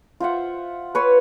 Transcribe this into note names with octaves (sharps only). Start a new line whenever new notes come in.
F4 C5 E5 F#5
B4 C#5 C6